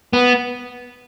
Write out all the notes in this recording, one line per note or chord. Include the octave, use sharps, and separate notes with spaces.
B3